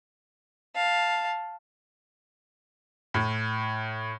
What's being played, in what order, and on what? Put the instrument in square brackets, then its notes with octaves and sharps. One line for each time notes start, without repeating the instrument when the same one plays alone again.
[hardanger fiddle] F5 A5
[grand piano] A2